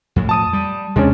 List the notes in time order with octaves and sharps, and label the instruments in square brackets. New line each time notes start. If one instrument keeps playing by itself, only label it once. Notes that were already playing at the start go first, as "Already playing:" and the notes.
[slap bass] F2 A2
[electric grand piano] A5 D#6 D#7
[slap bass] G3
[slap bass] D#2 C3 D4 [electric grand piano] G#3 C#4